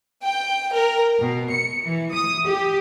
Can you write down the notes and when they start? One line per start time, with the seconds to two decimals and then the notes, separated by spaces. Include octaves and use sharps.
0.23 G5
0.73 A#4
1.19 B2
1.50 C#7
1.81 E3
2.12 D#6
2.46 G4